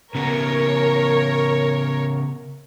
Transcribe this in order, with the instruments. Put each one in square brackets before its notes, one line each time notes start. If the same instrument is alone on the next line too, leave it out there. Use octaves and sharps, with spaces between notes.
[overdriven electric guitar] C#3 B3 [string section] A#4 C#5